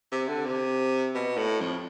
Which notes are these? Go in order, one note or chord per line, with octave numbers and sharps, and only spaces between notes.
C3
D3
C3
B2
A2
F2